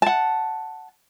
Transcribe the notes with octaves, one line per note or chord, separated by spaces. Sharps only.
F#5 A5